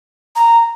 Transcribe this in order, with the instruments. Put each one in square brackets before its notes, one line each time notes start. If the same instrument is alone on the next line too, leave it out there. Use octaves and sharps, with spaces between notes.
[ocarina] A#5